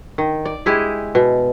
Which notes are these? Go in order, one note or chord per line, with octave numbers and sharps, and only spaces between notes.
D#3
D5
G#3 E4 G4 G#4
B2